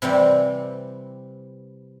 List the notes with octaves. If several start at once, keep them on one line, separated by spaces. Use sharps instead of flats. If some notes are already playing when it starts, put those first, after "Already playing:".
C3 E3 G3 C4